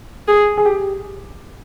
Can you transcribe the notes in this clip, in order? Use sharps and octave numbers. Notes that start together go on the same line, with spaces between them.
G#4
G#4
G4